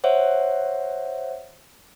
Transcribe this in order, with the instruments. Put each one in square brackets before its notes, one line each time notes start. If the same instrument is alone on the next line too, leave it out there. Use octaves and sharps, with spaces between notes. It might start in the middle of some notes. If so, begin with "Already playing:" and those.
[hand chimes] C5 C#5 E5 F#5